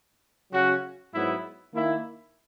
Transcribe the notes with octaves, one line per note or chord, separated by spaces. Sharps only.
C#3 F#3 C#4 F#4
G#2 F#3 B3 E4
D#3 A#3 E4